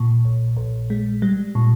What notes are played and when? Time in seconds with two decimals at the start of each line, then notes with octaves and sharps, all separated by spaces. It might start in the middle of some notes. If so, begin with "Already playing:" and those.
Already playing: A#2
0.25 A#1
0.57 A#1
0.90 G#3
1.22 G3
1.55 A#2